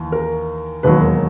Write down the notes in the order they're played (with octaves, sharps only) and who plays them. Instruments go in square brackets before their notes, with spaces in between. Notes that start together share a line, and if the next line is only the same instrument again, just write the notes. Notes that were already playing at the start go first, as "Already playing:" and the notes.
Already playing: [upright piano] D#2 E3
A#4
E1 D#2 D#3 F#3 B4
A#4